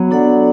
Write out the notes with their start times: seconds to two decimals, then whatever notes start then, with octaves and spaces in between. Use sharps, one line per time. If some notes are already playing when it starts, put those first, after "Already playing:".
Already playing: F#3 B3
0.11 D4 A4 D5 F#5